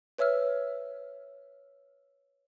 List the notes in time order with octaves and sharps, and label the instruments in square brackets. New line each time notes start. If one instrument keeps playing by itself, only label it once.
[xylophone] B4 C#5 E5 E6 F6